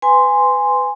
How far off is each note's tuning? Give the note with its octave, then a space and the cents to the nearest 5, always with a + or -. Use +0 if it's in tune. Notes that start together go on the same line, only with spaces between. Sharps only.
B4 +25 G#5 -10 C6 -5